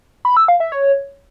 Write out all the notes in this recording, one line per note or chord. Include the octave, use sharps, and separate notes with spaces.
B5
E6
F5
E5
C#5